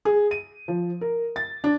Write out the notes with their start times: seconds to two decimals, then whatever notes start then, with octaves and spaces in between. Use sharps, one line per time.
0.05 G#4
0.31 D#7
0.68 F3
1.01 A#4
1.36 A6
1.64 D4